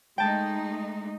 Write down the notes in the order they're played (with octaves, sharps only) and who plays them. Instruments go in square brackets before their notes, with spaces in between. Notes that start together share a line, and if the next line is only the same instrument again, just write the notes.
[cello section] G#3 A3 D#4 [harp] G5 A5